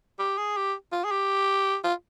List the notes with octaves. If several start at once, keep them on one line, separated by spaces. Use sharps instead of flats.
G4
G#4
G4
F4
G#4
G4
F4